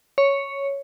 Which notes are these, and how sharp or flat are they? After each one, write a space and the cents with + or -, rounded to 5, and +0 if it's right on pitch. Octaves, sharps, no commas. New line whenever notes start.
C#5 +0